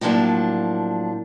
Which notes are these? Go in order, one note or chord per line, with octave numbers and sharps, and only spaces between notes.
A2 F3 F#3 A#3 D4